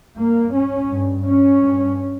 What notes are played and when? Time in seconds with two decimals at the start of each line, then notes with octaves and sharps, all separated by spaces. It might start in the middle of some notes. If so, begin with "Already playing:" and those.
0.17 G2 A#3
0.54 C#4
0.90 G2
1.27 C#4
1.63 G2